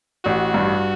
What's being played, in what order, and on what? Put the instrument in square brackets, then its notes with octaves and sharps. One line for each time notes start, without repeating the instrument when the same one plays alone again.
[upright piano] A1 [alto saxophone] F#4
[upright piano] G2